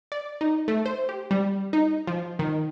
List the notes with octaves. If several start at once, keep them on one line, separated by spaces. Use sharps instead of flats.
D5
D#4
A3
C5
G4
G3
D#4
F3
D#3